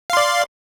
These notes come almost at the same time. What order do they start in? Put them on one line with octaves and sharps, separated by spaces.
F5 C6 D5